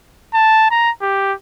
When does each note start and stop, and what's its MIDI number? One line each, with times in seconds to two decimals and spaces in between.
0.34 0.69 81
0.71 0.91 82
1.02 1.33 67